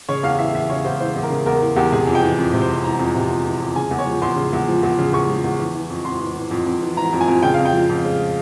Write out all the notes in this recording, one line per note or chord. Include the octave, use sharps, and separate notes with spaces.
C#3 C#5
E2 F5
E3 E5
E2 E5
C#3 C#5
E2 C5
E3 C5
E2
A#4
C#3
E2 A#4
E3
E2 G4
C3 G#4
F2
G5
E3
F2
C3
C5
F2
E3 A#5
F2
C3
F2
E3
F2
C#3 G#5
E2
C#5
F3
E2 C6
C#3
E2
F3
E2
C#3
E2 C#6
F3
E2
E3
E3
F2
F2 C6
E3
E3
F2
F2
E3
E3 A#5
F2
G#5
F2
C#3 G5
F5
F2
G5
F3
F2
C#3